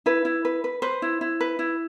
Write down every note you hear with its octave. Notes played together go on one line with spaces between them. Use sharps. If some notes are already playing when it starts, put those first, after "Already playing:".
E4 B4
E4
B4
B4
B4 C5
E4
E4
B4
E4